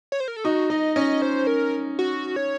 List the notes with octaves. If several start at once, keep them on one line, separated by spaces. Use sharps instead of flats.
C#5
C5
A#4
A4
D#4 F#4
D#4 D#5
C#4 D#5
C5
A#4
F#4
C#5